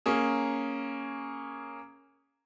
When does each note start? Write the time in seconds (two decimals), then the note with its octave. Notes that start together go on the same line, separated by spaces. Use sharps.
0.06 A#3 C#4 G#4